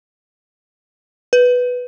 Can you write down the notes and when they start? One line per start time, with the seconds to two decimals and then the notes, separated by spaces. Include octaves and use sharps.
1.33 B4